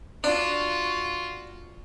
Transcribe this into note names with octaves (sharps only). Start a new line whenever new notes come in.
D4 F4 F#4